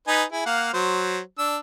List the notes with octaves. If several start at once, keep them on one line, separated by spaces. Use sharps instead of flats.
D#4 B4 G#5
E4 G#4
A#3 F5 F#5
F#3 C5
D4 E6